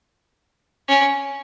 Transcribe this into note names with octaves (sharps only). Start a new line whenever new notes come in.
C#4